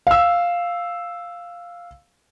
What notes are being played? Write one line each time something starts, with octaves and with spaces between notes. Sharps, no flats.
F5 E6